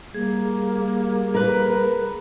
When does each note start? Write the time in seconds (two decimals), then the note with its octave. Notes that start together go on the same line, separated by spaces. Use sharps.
0.14 G3 A#3 G#4
1.35 A#4 B4